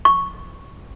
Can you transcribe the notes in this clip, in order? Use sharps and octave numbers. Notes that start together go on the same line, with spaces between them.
C#6